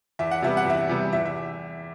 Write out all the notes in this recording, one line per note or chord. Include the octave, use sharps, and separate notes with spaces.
E2 E5
F#5
C3 G3 B3 E5
F#5
E2 E5
C3 G3 B3
E2 E5
E5